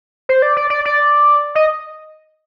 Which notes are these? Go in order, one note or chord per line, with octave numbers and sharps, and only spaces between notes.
C5
D5
D5
D5
D5
D#5